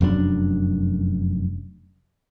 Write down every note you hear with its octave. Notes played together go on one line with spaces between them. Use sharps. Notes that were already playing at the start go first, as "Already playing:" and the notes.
F1 F#2 B2 D4